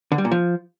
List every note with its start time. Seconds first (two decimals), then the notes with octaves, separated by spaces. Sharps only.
0.12 D3
0.18 G3
0.25 A#2
0.32 F3